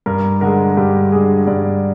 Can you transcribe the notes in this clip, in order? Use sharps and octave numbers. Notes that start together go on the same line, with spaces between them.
G2 A#4
D3 G#3 A#4
G2 G4
D3 G#3 G#4
G2 D5